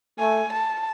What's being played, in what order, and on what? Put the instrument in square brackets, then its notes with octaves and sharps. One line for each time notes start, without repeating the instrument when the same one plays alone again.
[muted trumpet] A3 [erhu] G#5
[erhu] A5